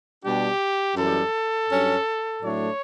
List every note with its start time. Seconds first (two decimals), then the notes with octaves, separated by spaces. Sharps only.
0.23 B2 G3 D4 G4
0.96 F#2 E3 G3 A4
1.69 G2 F#3 C#4
2.42 A2 F#3 A3 D4 C#5